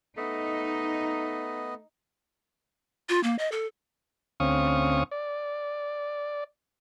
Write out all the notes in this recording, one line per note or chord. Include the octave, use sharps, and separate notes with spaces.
A3 B3 D#4 D#5
F4
A#3
D#5
A4
D2 C4 C#4 F5 C#6 D#6
D5